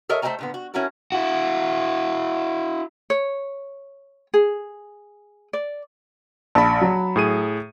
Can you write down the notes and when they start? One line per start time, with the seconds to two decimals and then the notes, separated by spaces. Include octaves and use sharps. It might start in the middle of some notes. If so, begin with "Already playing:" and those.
0.09 A4 A#4 C#5 D#5 E5
0.22 A3 A4 C5 D#5 G#5 A#5
0.39 A#2 D3 B3
0.54 F#4
0.74 C#4 E4 F#4 A4 A#4
1.12 E4 F#4
3.10 C#5
4.34 G#4
5.53 D5
6.55 A#1 A5 B5
6.81 F#3
7.16 A2 G#4 D#7